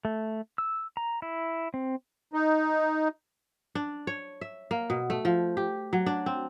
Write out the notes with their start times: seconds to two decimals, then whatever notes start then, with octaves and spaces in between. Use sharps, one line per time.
0.05 A3
0.58 E6
0.97 A#5
1.22 E4
1.74 C4
2.33 D#4
3.75 D4
4.07 C#5
4.41 E5
4.71 A#3
4.90 B2
5.10 A3
5.25 F3
5.57 G4
5.93 F#3
6.06 D4
6.26 C4